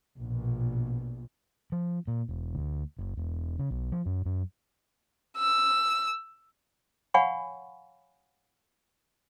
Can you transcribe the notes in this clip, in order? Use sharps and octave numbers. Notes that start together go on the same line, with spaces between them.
A#1 B2
F3
A#2
E1
D2
F#1
E1
C#3
B1
F3
F#2
F#2
E6
C#5 F5 F#5 G#5 B5 C#6